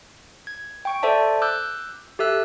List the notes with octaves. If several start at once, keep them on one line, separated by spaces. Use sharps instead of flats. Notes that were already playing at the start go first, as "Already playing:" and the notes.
G#6
G5 C#6 D7
A4 C5 D5 E5 A5
D6 E6 F#6 G6
G4 A4 E5 E6 F#6